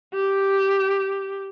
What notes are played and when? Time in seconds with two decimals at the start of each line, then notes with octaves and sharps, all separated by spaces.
0.14 G4